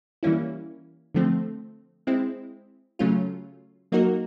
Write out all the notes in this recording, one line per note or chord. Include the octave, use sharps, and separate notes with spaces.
E3 G3 A#3 C#4 E4
D3 F3 A3 C4
G#3 C4 E4
C#3 F#3 A3 C#4 F4
F#3 A#3 D#4 F#4 A#4